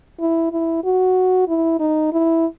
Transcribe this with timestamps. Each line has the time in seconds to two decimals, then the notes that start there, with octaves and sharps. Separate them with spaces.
0.20 E4
0.52 E4
0.84 F#4
1.48 E4
1.80 D#4
2.12 E4